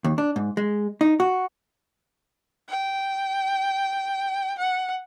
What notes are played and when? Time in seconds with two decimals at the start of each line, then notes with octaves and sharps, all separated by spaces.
0.04 D#2
0.18 D4
0.36 G#2
0.57 G#3
1.01 D#4
1.20 F#4
2.69 G5
4.59 F#5